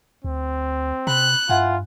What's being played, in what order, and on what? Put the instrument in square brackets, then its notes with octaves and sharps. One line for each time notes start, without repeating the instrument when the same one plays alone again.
[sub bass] D2 [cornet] C4
[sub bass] C3 [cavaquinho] B5 [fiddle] F#6
[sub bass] G2 [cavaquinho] E4 F#5 G#5 [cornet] F4